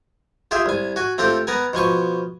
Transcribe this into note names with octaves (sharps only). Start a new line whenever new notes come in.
F4 G4 G#4 E5
C2 G#5
F#4 G#5
A3 C4 F4 G4
B3 A#4 G#5
B2 F3 G#5 C#6